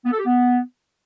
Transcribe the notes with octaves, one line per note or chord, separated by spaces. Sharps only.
B3
A4
G4
B3